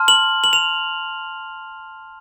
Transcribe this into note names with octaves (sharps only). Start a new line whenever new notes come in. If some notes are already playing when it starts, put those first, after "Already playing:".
Already playing: A5 C6 F6
F#7
F#7
F7